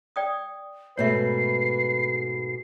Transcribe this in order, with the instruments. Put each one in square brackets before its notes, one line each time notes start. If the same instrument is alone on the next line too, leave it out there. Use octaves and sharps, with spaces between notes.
[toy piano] D5 G5 D#6
[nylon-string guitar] G#2 B2 A3 [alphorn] B4 [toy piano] C#5 E5 [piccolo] C7